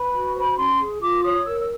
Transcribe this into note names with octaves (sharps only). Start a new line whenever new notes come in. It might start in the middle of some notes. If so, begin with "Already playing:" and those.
Already playing: B4 B5
F#4
C5 B5
C#4 C6
G#4
F4 D6
C#5 D#6
A#4 E6
E6